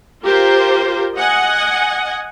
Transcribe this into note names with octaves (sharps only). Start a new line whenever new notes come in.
F4 G4 A#4 C5
D#5 F#5 G#5